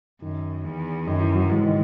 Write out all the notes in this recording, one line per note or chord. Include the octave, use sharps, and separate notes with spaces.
F#2 D#3
E2
F#2 D#3
E3
F#3
G#2 E3
D#3